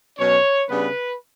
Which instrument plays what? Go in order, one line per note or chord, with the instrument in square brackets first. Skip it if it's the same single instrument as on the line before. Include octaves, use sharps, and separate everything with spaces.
[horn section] B2 F#3 C#4 C#5
C#3 G3 B3 D4 B4